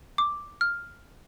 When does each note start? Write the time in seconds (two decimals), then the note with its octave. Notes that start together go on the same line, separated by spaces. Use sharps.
0.18 D6
0.61 F6